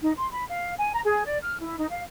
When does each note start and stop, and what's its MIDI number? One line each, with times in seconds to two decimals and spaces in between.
0.02 0.11 63
0.17 0.27 84
0.32 0.43 83
0.50 0.74 77
0.78 0.90 80
0.93 1.00 82
1.04 1.25 68
1.25 1.37 74
1.41 1.62 89
1.62 1.75 64
1.78 1.86 63
1.90 2.01 77